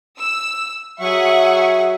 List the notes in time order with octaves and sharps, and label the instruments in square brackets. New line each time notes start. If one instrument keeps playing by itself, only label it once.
[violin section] E6
[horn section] F#3 E5 [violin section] G#4 F#5 C#6